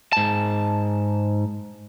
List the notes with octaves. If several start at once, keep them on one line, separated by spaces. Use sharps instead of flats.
G#2 A5